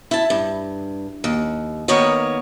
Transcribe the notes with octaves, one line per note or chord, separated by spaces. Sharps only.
E4 A5
G2
D#2
D#3 A#3 B3 A#4 C#5 D#5